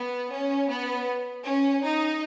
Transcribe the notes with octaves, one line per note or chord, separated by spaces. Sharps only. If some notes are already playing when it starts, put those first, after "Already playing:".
Already playing: B3
C#4
B3
C#4
D#4